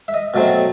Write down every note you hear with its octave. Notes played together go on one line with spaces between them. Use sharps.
E5
D#5
B2 F#3 A3 C4